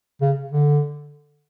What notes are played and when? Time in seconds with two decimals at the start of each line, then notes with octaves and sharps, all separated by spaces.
0.21 C#3
0.51 D3